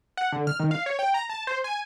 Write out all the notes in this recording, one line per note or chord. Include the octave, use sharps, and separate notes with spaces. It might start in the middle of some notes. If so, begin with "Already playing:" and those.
F#5
D3
F6
D#3
F5
C#5
G5
A#5
A5
C5
G#5